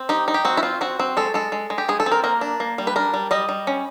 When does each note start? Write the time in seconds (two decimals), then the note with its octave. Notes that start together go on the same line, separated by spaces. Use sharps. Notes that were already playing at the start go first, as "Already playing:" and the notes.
Already playing: C4
0.09 D#4 G4
0.28 D#4
0.34 G4
0.45 C4 F#4
0.57 E4
0.63 C4 F4
0.81 C4 F#4
0.99 C4
1.17 G#3 A4
1.34 G#3 A4
1.52 G#3
1.70 G#3
1.78 G4
1.88 G#3 G#4
2.00 A4
2.06 C4
2.12 A#4
2.24 A#3 A#4
2.41 D4
2.60 A#3
2.78 G3
2.87 B4
2.96 D4 A#4
3.14 G3
3.31 G3 D#5
3.49 G3
3.67 C#4